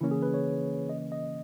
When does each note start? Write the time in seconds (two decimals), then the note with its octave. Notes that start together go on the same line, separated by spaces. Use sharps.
0.01 C#3 E3 A#3 C#4 E4
0.11 G#4
0.22 B4
0.34 C#5
0.89 D#5
1.12 D#5